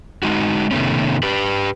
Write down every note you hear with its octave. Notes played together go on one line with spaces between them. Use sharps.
G#3 D#4 F#4
C3 D#3 A3 B3 C#4
G4 B4